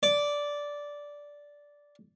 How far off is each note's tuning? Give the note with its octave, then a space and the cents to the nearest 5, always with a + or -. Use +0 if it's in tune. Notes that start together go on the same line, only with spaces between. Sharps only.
D5 -10